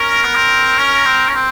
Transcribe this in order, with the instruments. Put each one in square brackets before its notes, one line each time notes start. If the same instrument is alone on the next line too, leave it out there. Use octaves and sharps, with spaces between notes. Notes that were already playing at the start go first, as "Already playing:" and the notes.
Already playing: [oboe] C#4 [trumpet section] A#4
[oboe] B3
C4
C#4
C4
C#4
C4